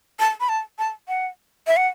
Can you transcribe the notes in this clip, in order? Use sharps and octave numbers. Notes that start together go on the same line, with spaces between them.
A5
B5
A5
A5
F#5
E5
F#5